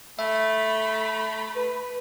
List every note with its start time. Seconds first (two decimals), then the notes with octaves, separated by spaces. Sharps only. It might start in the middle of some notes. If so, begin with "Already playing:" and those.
0.19 A3 E5 B5
1.56 B4